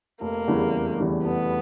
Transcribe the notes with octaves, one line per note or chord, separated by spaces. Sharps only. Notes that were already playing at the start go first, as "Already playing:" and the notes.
F1 A#3
E2 C#3 E3 G3
F1
E2 C#3 E3 G3
F1 B3